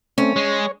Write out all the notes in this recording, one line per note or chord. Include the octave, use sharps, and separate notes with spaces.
A3 C4 C#4
G#3 C#5